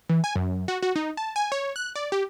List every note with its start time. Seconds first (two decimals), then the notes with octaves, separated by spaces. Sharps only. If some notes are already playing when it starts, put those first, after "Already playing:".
0.09 E3
0.24 G#5
0.36 F#2
0.68 F#4
0.83 F#4
0.96 D#4
1.17 A5
1.36 G#5
1.52 C#5
1.76 F#6
1.96 D5
2.12 G4